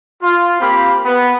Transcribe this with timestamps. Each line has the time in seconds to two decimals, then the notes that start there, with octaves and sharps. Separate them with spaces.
0.22 F4
0.60 A#3 C4 G4 F5 B5
1.05 B3